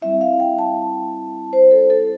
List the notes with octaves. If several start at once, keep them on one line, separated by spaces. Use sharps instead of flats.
G3 C4 E4 E5
F5
G5
A5
C5
A4
A4